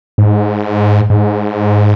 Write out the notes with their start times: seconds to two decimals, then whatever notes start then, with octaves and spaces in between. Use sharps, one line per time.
0.18 G#2
1.10 G#2